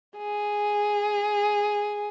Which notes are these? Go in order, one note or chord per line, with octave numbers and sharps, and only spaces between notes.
G#4